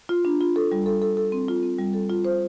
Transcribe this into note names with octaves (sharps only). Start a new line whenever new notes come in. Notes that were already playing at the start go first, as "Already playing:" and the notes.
F4
D4
F4
A4
G3
A4
A4
A4
C4
F4
C4
G3
A4
F4
C5